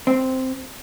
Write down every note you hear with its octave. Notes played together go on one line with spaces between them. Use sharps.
C4